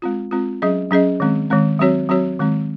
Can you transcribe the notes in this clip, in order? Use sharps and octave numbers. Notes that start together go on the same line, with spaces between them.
G#3 C4 F4
G#3 C4 F4
F#3 C#4 G#4 D#5
F#3 C#4 G#4 D#5
D#3 G#3 C4
D#3 G#3 C4
F#3 C4 F#4 C#5
F#3 C4 F#4 C#5
D#3 G#3 C4